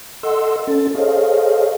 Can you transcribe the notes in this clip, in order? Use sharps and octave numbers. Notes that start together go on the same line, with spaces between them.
A4 D#5 F#5 C6 E6
C#4 A4 A6
G#4 A4 C5 C#5 D#5 F5